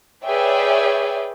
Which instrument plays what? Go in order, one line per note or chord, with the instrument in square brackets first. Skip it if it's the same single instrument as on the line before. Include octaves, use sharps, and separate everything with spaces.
[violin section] G#4 B4 C#5 D5 E5 G5